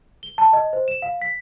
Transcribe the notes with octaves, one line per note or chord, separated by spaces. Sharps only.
G7
A5
D#5
C5
E7
F5
B6